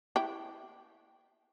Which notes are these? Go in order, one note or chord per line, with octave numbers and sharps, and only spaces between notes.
E4 G4